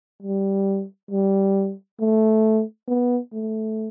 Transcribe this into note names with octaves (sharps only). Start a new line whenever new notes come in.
G3
G3
A3
B3
A3